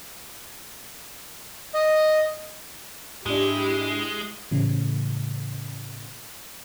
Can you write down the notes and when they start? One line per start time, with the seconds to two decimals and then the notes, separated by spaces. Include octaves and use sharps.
1.74 D#5
3.26 G#2 G#3 D4 E4 G4
4.51 A2 C#3 E3